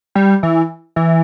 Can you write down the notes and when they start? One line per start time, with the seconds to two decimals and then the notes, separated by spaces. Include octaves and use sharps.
0.15 G3
0.43 E3
0.96 E3